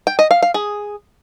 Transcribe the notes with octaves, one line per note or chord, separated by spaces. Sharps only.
G5
D#5
F5
F5
G#4